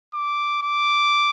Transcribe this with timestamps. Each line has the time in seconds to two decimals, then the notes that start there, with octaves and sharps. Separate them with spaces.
0.14 D6
0.63 D6